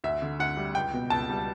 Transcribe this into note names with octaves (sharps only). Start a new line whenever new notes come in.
D2 E5
D3
D2 F#5
G3
C#2 G5
B2
C#2 A5
G3